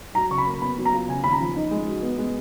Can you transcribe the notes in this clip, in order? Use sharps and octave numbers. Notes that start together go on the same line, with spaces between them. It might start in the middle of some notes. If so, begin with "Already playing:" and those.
F#3 A#5
C#3 C#6
B5
A#3
B3 B5
F#3
A#5
F4
C#3 G#5
D#2 B5
A#5
F3
D#4
G#3
F#4
B3
G#3